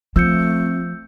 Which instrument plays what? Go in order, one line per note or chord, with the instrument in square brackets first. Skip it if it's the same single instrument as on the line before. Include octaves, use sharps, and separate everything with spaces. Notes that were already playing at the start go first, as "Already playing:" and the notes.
[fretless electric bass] F3 [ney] A3 [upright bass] C4 [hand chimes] E6 G6 C#7